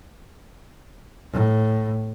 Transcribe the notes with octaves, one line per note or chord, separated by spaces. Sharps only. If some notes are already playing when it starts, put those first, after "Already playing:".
A2